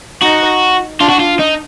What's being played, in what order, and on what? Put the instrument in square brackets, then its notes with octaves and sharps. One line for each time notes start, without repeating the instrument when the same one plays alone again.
[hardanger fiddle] D#4 [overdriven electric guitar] F#4
[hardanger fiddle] D4 [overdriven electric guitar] F4
[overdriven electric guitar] F#4
F4
D#4